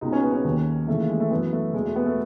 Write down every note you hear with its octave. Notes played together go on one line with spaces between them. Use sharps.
C#2 B2 D#4
C#4
B3
C#4
D#2 D#3
D#2 C#3 E3 A3
G#3
A3
F#2 E3 B3
A3
E2 B2 G#3
A3
B3
A3